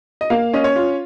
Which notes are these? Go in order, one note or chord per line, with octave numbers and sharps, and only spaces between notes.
D#5
A#3 F5
C#4 D#5
C#5
F4